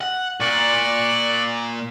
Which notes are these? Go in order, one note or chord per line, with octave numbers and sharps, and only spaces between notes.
F#5
A#2 D5 C#6 F#6